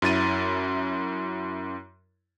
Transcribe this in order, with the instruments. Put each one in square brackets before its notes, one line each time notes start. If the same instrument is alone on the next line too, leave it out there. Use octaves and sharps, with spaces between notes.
[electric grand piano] F#2 E4 A6 D#7